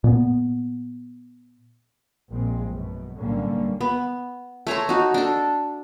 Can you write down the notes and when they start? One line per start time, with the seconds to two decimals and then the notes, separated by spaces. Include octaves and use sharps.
0.04 A#2 B3
2.30 A#1 A#2 G#3 C4
2.67 F#2 B2
3.18 B1 A2 D3 G3 A#3 C#4
3.81 B3
4.67 A3 C#5 A#5 C6
4.89 D#4 F#4
5.14 D4 A4